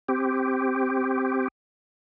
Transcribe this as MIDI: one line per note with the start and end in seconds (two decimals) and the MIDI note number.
0.09 1.48 60
0.09 1.48 67